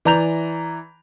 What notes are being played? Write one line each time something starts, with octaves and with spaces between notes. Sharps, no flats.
E3 D5 A#5 G6 F7